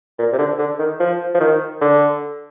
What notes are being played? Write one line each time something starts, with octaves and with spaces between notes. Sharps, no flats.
A#2
C3
D3
D3
D#3
F3
F3
D#3
D3